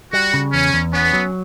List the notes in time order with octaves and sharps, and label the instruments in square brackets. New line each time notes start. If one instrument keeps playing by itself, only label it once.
[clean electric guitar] G3 [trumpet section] F#4
[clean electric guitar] C#3
[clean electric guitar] E2 [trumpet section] C#4
[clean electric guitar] E2
[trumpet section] B3 [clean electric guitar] C#4
[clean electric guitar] F#3